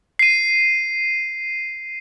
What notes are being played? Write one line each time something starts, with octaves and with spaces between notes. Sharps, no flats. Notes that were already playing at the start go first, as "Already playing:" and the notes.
C7 D#7